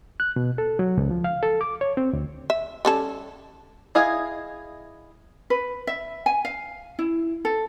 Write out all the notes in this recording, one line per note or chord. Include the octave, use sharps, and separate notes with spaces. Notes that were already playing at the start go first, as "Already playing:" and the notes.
F#6
B2
A4
F#3
C#2
F3
F5
A4
D6
C#5
C4
D2
E5
G3 C#4 A4
E4 G#4 D#5 F5
B4
E5
G#5
F5
E4
A4